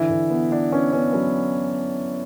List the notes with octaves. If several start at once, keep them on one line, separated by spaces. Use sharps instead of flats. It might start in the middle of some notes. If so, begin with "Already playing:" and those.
Already playing: D3 E3 E4
D3
B3
B3 D4
B3 C#4
B3 C#4
F#3 C#4